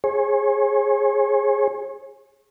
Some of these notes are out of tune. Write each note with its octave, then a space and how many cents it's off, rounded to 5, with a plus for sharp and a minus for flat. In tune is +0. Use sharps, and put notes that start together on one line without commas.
G#4 +0 C#5 -40